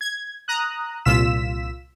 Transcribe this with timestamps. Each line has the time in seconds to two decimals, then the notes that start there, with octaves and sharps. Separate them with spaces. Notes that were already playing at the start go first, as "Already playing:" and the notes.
0.01 G#6
0.48 A#5 D#6 F#6
1.05 C2 A#2 F4 E6 B6 E7